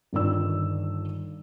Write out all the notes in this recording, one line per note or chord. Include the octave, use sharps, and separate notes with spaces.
G1 G2 D#3 F4 D5 E6